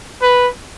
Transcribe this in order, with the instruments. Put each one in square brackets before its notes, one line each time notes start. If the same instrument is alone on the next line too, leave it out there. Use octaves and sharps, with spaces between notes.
[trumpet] B4